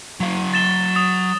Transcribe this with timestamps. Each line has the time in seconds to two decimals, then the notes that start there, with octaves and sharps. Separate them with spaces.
0.20 F#3 F5
0.54 A6 E7 G7
0.95 D#6 A6